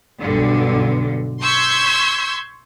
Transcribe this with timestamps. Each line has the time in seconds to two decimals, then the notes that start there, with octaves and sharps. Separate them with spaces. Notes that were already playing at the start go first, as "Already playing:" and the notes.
0.22 B1 G2 D3
1.42 C6 C#6 E6 G6 G#6 B6